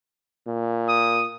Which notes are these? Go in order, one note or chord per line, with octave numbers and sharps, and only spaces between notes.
A#2
D#6